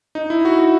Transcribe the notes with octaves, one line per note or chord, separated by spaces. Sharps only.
D#4
E4
F#4
F#4